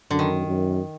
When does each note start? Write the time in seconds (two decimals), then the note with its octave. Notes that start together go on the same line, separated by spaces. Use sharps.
0.11 F#2 D3
0.19 D#3
0.47 F#2